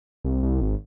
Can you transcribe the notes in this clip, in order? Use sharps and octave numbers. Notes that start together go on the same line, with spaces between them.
C2
C2
G#1